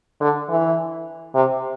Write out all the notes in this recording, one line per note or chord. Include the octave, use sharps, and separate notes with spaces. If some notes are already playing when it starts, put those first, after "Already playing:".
D3
E3
C3